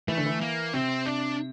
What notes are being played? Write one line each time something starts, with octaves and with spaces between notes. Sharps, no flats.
E3 A3
D3
E3
A#3
C3 C4
D4